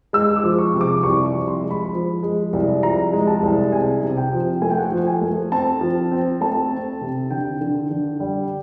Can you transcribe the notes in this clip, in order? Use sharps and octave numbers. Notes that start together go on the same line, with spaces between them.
G#3 E6
D6
F3
C#6
C3
D6
C2 C#6
C#6
F3
C6
G#3
B5
F3
G#3
C2
F3 A#5
G#3
A5
C2
C3 G#5
C3
G5
F3
A3 G#5
G5
F#5
G5
F3
G#5
A3
C4 A5
F3
C4
A3 A5
C4
C3
D3 G5
D3
D3
G3